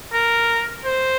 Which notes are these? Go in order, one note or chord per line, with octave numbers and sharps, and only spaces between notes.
A#4
C5